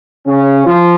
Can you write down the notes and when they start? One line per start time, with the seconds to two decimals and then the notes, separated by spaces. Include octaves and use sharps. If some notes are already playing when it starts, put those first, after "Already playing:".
0.27 C#3 C#4
0.67 F3 F4